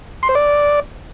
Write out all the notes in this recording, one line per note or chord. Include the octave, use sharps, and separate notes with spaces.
C6
C5
D5